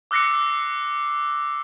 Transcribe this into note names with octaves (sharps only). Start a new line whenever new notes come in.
D6 E6 F#6 A#6 C7 C#7